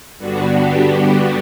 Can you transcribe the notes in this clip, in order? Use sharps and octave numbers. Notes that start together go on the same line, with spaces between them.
G2 D3 G3 B3 D4 F#4
G4